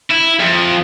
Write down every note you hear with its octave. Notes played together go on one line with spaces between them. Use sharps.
E4
F2